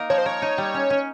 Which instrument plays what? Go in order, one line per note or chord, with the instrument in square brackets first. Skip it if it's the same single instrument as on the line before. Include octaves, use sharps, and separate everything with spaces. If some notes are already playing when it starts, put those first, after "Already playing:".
Already playing: [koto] A#3 D#4 A#4
[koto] F3 [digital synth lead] C#5
[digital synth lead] C5
[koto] A#4 [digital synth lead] C#5
[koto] D#4
G3
C#4
C#4